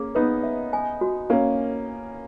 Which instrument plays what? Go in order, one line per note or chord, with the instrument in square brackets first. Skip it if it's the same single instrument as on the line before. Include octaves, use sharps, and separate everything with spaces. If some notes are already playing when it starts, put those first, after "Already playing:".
Already playing: [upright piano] A#3 C#4 [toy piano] G#4
[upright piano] B3 D#4 [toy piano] B4
[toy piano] E5
G#5
F#4
[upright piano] A#3 C#4 [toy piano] A#4